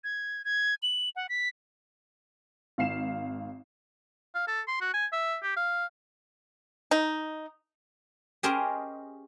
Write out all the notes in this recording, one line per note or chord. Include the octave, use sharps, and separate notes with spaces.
G#6
G#6
F#7
F#5
B6
G#1 F5 C7 E7
F5
A4
C6
F#4
G#5
E5
G4
F5
D#4
C#4 G4 G#4 A#4 C5 D#5